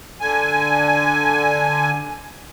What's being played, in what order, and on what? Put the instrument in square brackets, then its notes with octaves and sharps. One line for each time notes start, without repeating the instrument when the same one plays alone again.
[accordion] D3 G#5